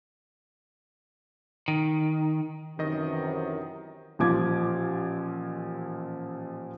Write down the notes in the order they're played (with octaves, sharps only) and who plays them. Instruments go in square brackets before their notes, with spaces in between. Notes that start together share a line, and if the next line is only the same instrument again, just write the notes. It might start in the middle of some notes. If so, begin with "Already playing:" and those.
[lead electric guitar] D#3
[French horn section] F#2 C3 E3 [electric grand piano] D#3 D#5 D#6
[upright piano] A1 A#2 F3 D6 G#6